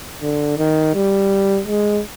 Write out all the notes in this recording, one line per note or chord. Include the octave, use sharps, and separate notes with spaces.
D3
D#3
G3
G#3